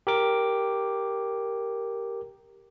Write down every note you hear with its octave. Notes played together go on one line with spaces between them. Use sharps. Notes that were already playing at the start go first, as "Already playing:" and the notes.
G4 A#4 D6